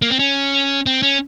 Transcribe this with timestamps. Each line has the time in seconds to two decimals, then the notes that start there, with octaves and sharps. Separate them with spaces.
0.02 A#3
0.10 C4
0.19 C#4
0.86 C4
1.02 C#4